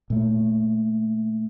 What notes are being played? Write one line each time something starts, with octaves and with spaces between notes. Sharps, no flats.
A#2 A3